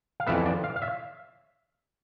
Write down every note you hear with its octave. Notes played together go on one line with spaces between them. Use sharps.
F5
F2 E3 B3 E5
D5
F5
F5
E5